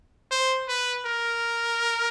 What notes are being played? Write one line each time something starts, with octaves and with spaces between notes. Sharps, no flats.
C5
B4
A#4